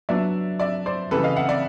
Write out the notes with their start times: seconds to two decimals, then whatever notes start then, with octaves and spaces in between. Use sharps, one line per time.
0.09 F#3 B3 D4 D5 E5
0.60 D5 E5
0.86 C5 D5
1.11 C#3 E3 G3 A4 B4
1.23 D#5 F5
1.36 E5 F#5
1.49 D5 E5